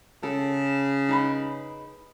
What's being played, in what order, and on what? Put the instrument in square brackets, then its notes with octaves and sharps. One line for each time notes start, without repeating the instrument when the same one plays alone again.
[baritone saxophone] C#3 [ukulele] A4
[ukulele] D#4 B4 B5